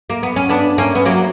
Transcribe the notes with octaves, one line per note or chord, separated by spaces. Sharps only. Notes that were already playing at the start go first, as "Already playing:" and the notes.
A#3
B3
C#4
B3 D4
A#3 C#4
B3
F#3 A#3